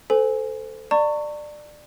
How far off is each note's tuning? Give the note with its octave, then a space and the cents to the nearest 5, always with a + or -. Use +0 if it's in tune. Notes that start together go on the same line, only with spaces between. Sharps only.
A4 +0 C5 -25 G#5 +0
D5 +20 A#5 -45 C#6 +0